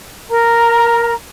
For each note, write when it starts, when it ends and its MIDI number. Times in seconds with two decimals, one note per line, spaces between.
0.29 1.13 70
0.29 1.13 82